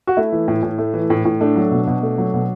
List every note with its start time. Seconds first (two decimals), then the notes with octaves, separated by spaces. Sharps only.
0.07 F#4
0.17 A3 E4
0.32 E3
0.48 A2
0.63 A2
0.78 A3
0.94 E3
1.10 A2
1.25 A2
1.41 A3 D4
1.56 F#3
1.72 B2
1.87 B2
2.03 A3
2.18 F#3
2.34 B2